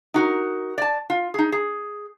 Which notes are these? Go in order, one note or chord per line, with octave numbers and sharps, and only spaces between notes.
D#4 F#4 A#4
D5 A5
F4
D#4 G#4
G#4